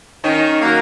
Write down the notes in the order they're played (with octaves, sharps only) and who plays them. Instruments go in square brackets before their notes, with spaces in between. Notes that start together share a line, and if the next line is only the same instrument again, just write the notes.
[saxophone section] D#3 [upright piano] C#4 D#4
[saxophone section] F#3 A#3